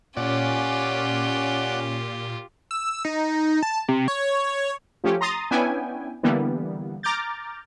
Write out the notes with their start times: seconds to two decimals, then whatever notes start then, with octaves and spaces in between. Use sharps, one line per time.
0.17 A#2 C#4 F4 G4 D5 F#5
2.71 E6
3.05 D#4
3.63 A5
3.88 C3
4.08 C#5
5.04 F3 A3 C#4 G4
5.21 A#5 C6 D#6 A6
5.51 B3 C#4 D4 E4 G5 G#5
6.23 D3 E3 G3 A#3 B3
7.03 A#5 D6 F6 G6 A6